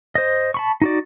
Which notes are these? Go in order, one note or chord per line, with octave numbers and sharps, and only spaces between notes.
C5 D#5
A5 B5 C#6
D#4 F#4 D5